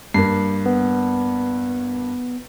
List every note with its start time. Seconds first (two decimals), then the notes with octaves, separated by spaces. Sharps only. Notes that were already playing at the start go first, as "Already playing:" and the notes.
0.14 G2 A#3 C7
0.66 B3